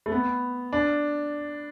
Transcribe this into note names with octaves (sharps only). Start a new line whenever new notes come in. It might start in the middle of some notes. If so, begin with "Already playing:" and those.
A3
B3
D4